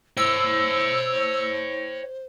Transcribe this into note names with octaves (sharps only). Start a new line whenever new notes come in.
C5 C#5 G5 E6